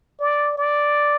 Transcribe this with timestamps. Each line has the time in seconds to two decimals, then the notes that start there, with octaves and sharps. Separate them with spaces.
0.19 D5
0.58 D5